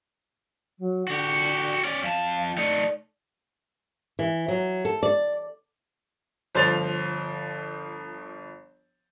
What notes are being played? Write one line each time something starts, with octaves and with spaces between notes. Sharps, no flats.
F#3
D3 F#4 G4
C#4 D5
F2 F5 A5
A3 D#4 D5
E3
F#3
A4
D5
G1 F3 C5 A6 F7